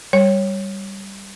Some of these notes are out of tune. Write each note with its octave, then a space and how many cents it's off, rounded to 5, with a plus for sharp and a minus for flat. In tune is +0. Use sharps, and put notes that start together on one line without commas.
G3 +0 C#5 -10